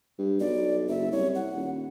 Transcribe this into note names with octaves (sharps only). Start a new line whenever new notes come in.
G2
B1 D5
F#1 E5
C2 C#5
F#5
D#1